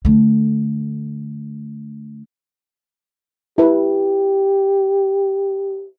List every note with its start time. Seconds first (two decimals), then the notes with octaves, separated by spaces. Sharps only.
0.05 D3 A3
3.58 E4 G4 B4